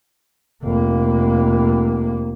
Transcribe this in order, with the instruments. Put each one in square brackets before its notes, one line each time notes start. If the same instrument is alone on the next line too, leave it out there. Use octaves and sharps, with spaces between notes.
[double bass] F1 A#3